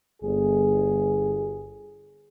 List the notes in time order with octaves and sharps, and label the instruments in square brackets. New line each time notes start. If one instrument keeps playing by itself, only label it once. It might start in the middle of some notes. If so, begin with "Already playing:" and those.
[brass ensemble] G1 G#4